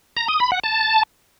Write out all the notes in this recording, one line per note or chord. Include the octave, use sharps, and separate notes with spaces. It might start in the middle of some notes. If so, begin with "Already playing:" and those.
A#5
D#6
B5
F#5
A5